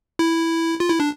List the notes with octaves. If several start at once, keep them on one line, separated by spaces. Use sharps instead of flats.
E4
F4
E4
D4